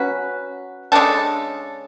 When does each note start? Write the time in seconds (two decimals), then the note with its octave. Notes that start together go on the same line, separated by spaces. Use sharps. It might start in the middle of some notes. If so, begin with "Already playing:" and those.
Already playing: F#3 C#4 F#4 B4
0.92 C#3 G#3 D4 A4